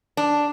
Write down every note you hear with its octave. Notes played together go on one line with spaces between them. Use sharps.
D4